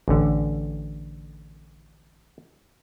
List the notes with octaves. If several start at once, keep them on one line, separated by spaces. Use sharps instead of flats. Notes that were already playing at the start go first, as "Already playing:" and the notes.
A1 D3